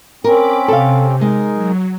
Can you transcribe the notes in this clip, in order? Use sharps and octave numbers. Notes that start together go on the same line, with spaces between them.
C4 C#4 A#4 B5 D6
C3 A4 F5
G#3 D#4 G#4 A#4
F#3